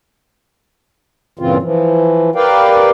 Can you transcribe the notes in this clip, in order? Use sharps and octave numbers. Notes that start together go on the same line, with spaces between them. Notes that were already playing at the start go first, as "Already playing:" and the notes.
G2 A#2 C#3 E3 C4 F4
E3 F3
G4 A#4 B4 D5 F5 G5